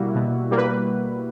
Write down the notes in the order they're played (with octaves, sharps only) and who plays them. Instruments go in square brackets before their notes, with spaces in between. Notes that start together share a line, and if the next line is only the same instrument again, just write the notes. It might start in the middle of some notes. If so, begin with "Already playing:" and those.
Already playing: [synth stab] B2 G3 A#3 E4 F#4
B2
G3 A#3
B4